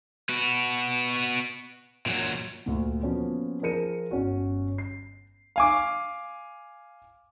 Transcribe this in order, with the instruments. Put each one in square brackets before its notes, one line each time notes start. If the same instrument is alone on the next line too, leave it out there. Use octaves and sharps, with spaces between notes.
[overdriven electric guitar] B3 F#4
A#2 F#3
[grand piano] D2 A#2
F3 A#3 B3 C#4 F4 F#4
F3 G#4 A#4 C#7 D#7
G1 C#4 F#4
C7
F5 G#5 D6